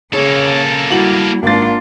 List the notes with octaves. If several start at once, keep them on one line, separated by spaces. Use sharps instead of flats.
C#3 A#3 G#4 A4 C#5
G3 E4 F#4 F#7
G#1 A#3 D4 F4 A6